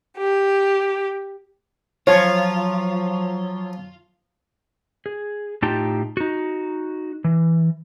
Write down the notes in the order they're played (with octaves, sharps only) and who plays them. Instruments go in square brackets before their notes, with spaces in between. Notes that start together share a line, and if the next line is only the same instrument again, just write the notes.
[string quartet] G4
[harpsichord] F3 [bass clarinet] F#3 [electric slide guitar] F4 [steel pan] C#5
[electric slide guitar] G#4
A2 D#4 F4 G4 G5 A5
D#4 F#4
E3